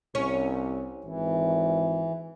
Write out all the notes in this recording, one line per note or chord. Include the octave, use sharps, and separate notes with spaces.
C2 C#4
G#1 E3